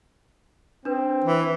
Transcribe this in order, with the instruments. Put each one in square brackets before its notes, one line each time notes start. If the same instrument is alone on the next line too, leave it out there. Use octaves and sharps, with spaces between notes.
[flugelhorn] C4 [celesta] D4 B4
[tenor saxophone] E3